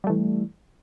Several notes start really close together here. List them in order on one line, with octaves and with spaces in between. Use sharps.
G3 A3 E3